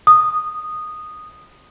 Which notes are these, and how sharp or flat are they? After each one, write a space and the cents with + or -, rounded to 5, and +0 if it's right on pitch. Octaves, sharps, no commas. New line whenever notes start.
D#6 -10